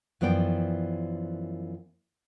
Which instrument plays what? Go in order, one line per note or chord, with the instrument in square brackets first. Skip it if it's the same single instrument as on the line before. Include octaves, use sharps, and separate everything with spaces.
[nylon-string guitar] F#2 E3 F3 B3 D5 G5